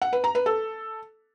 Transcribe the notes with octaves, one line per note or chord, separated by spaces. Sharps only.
F#5
B4
A#5
B4
A4